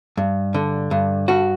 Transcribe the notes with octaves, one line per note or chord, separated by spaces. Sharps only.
G2
D3
G2
G2 F#4